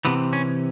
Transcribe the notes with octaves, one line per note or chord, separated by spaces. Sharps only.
C3 E3 B3
C#4